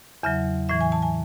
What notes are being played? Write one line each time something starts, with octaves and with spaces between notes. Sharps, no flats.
E2 C#3 F#3 E5
A2 E3 E5
G#5
A5
G#5